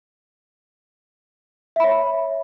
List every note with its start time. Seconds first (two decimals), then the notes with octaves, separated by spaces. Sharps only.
1.76 E5
1.80 B5
1.84 C#5